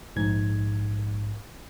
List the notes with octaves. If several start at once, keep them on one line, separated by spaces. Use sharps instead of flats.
A#1 G#2 G#6